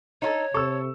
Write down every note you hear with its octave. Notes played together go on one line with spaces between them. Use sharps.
D#4 F4 A4 C#5
C3 A4 C#6 E6